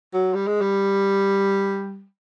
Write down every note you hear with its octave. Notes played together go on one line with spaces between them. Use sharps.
F#3
G3
G#3
G3